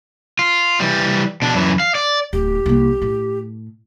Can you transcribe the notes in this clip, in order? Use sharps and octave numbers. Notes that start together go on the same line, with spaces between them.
F4
E3 G3
B2 D4
F#2 E3
F5
D5
D1 G4
C2 A#3
A2